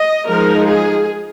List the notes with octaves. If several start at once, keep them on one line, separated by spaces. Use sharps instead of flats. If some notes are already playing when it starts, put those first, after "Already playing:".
Already playing: D#5
F3 G#3 D#4 A#4
G#4